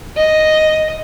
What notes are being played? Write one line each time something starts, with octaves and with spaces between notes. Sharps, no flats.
D#5